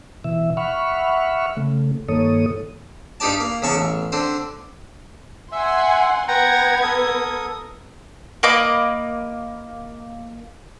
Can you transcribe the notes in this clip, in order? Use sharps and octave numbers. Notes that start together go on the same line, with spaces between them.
B2 E3 E5
E5 F#5 B5 C#6 F6
C#3 A3
G2 D#3 A#3 A4 C#5 D#6
G2 G3 D#4 G4 D5 A5
A#3
E2 C#3 A5 C#6
A1
D3 C4 C5
E5 F#5 G#5 C6
B3 F#5 G5 A#5 G#6
A4 A#4 D#6
A#3 D#5 B5 D6